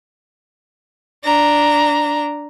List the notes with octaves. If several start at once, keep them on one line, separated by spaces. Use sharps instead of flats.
D4 A#5